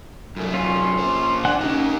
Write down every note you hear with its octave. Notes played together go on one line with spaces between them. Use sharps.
F#2 A3
C#4 F4
A#2 C5
D4 F#5 G#5 F#6
C#4 D#4 G4